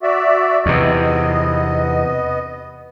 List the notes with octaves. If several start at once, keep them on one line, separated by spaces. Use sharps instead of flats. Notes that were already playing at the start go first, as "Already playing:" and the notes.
F#4 D5 E5
E2 C3 B3 D#5